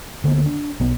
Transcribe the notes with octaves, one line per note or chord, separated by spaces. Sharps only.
D2 D3 A#3 B3
D4
B1 B3